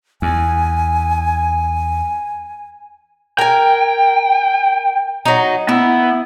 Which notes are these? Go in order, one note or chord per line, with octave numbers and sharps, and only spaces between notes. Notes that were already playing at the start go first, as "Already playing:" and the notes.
E2 G#5
A#4 G5 G#5
F#3 D#4
B3 E4